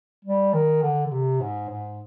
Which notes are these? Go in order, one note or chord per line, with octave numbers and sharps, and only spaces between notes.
G3
D#3
D3
D3
C3
G#2
G#2